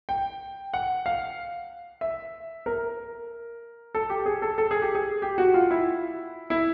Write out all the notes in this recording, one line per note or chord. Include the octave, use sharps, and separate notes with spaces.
G5
F#5
F5
E5
A#4
A4
G4
G#4
A4
A4
G#4
G4
G#4
G4
F#4
F4
E4
E4